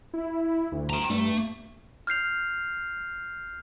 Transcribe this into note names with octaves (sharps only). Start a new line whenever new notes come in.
E4
D2
G5 A#5
G2 A3
F6 G6 C7 F7